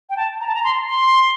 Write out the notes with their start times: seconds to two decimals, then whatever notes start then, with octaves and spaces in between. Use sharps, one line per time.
0.10 G5
0.17 A5
0.41 A#5
0.47 A5
0.55 A#5
0.64 C6
0.88 C6